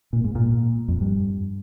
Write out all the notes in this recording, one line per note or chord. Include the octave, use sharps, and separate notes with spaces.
A#2
G#2
A#2
F2
G2